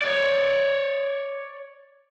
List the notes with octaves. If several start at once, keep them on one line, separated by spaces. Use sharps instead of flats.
C#5 D5